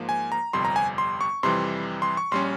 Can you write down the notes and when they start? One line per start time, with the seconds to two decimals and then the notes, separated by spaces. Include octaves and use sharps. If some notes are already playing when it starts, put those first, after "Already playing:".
Already playing: G#2 F3 A#3
0.09 G#5
0.32 A#5
0.53 G1 F2 C3 G3 C6
0.65 A#5
0.76 G#5
0.98 C6
1.21 C#6
1.43 F2 C3 E3 G3 C6
2.02 C6
2.17 C#6
2.32 A#1 G3 C#4 C6